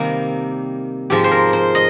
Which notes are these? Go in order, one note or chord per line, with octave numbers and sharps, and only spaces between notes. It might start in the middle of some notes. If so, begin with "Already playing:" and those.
Already playing: C3 D#3 G3 A#3
G#2 F3 G#3 G4
C5
A#4
C5
D#5